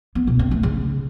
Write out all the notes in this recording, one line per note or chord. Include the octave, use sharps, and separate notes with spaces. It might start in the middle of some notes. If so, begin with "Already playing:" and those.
B3
B2
C4
A3
C#3